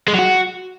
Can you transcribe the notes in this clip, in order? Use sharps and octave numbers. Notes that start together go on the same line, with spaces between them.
G#3
F#3
F#4